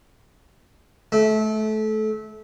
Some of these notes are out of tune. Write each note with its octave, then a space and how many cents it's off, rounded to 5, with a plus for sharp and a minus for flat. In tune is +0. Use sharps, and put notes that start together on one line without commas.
A3 -25